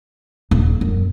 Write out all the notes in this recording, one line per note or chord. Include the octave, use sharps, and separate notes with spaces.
D#1
F#2